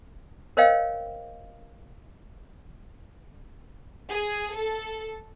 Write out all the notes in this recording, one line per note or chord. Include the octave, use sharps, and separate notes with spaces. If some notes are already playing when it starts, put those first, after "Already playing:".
A#4 C5 C#5 D#5 F5 G5
G#4
A4